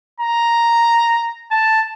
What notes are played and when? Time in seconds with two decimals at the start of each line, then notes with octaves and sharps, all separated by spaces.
0.20 A#5
1.51 A5